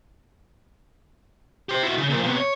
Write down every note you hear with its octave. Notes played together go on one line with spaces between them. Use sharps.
G4 C5
E4 F#4
C#3
A#2 F3
C3 B3
C#5